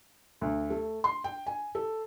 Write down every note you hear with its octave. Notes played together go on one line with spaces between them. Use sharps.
D2
A3
C6
G5
G#5
A4